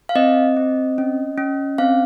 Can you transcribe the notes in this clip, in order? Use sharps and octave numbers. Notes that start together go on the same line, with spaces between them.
F5
C4 D#5
C4
C#4
C#4
C4 F5